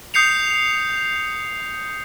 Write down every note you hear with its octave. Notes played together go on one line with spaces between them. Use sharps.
D#6 G6 C7 C#7 F7